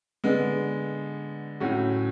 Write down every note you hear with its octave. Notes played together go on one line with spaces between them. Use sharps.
D3 G#3 B3
A2 F#3 A3 C#4 F#4